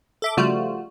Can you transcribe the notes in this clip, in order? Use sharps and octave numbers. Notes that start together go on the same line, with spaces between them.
A4 E5 D6
C#3 F3 G3 A3 F4 F#4